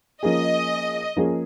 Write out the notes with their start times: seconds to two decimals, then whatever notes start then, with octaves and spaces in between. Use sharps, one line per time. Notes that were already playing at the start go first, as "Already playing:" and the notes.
0.23 F3 A#3 C#4 G#4 D#5
1.17 F3 A#3 C#4 G#4